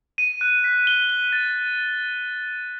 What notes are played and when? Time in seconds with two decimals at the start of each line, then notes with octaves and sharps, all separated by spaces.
0.18 D#7
0.41 F#6
0.64 B6
0.87 G7
1.09 G7
1.32 A6